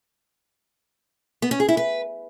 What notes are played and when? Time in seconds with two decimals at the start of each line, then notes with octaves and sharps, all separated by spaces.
1.42 B3
1.51 C#4
1.60 G#4
1.68 E4
1.77 B4